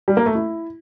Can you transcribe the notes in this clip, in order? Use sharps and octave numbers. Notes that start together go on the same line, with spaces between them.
G3
A#3
A3
E4